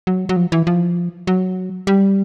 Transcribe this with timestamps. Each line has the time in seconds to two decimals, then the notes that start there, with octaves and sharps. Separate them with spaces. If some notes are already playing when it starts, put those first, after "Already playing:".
0.07 F#3
0.29 F#3
0.36 F3
0.52 E3
0.67 F3
1.27 F#3
1.87 G3